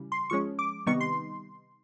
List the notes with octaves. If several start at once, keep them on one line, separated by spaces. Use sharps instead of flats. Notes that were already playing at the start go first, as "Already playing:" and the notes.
Already playing: C#3 E3 G3
C6
F3 G#3 C#4 C#6
D6
C3 D#3 G3 B3 D#4 C#6
C6